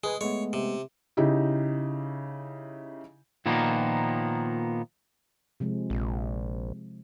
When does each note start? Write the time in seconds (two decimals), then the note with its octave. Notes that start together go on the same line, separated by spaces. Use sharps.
0.04 G#3 G#4 B4 G#5
0.21 G#3 A3 B3 C#5
0.53 C3
1.17 C#3 D#4 E4 G4
3.46 A#2 D#3 F3 A#3 B3
5.60 C3 F3 G#3
5.90 A#1